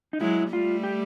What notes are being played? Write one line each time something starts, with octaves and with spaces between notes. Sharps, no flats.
D#4
F#3 G#3 E4
G3 A3 F4
G4